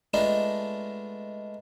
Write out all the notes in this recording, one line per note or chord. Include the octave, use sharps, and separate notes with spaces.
G#3 A3 B3 D4 D#4 F4